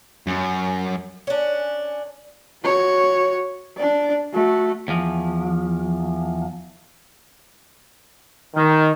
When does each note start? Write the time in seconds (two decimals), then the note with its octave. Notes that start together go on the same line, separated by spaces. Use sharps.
0.27 F#2
1.27 C#4 D4
2.64 F#4 C#5
3.77 D4 D5
4.33 A3 F#4
4.88 E2 F3
8.54 D#3